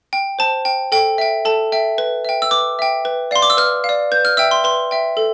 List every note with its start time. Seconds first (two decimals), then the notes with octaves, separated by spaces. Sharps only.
0.13 G5
0.39 C5 A5
0.65 G5
0.92 A4 G5
1.18 E5 G5
1.45 A4 A5
1.72 E5 G5
1.98 B4
2.25 E5 G5
2.42 E6
2.51 B4 D6
2.79 E5 G5
3.05 B4
3.31 D5 F5 C6
3.42 D6
3.50 E6
3.57 B4 F6
3.84 F5
3.89 D5
4.12 B4 G6
4.25 F6
4.37 E5 G5 E6
4.51 C6
4.64 B4 C6
4.91 E5 G5
5.17 A4